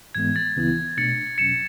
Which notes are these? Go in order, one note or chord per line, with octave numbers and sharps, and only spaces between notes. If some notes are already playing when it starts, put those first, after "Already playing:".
G#2 E3 G#3 B3 G#6
A6
C#2 C#3 E3 B3 E4
B2 A3 D4 A6 C#7
E2 B2 F#3 C#4 C#7 E7